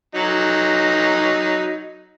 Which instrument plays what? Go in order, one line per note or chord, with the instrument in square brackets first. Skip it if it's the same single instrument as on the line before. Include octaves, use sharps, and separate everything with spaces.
[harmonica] F#3 D#4